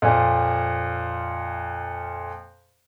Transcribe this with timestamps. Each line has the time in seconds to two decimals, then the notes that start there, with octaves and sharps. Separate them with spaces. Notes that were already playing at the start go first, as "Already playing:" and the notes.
0.02 F2 A#2